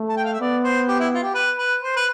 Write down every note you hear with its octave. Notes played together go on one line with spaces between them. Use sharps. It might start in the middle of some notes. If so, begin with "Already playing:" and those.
Already playing: A3
A5
G5
F5
E5
B3 D5
C5
G4
E4
F4
G4
B4
B4
C5
B4